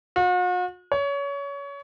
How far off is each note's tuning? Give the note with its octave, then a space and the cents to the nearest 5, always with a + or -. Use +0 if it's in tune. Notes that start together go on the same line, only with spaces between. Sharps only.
F#4 -45
C#5 +25